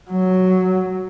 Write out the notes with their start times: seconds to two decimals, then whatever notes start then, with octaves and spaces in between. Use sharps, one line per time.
0.11 F#3